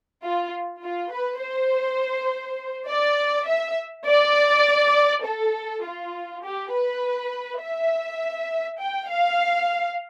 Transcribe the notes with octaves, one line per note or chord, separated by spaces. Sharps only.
F4
F4
B4
C5
D5
E5
D5
A4
F4
G4
B4
E5
G5
F5